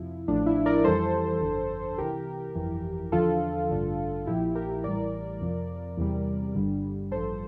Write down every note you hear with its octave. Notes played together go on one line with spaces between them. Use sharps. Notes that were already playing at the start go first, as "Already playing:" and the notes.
Already playing: F2 C3 F3 E4
A1 A2 F3 D4
E4
A#4 D5
F2 E3 G3 A4 C5
G1 F2 D3
C2 C3 E3 G4 A#4
G1 F2 E3
E2 D3 F3 F4 A4
A1 G2 D3
A#1 A#2 F3 E4 G4
G4 A#4
A1 A2 E3 G3 A#4 D5
F2 C3 F3
E2 C3 G3
G1 G2 D3 G3
A1 G2 F3 A4 C5